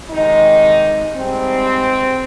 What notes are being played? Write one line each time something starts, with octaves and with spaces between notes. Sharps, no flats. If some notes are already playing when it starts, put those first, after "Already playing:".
C3 D#3 G#3 D#4
G#2 G3 C4